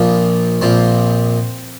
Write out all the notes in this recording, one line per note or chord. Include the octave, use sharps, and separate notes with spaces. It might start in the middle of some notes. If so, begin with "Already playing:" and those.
Already playing: A#1 A#2 F3 C4
A#1 A#2 F3 C4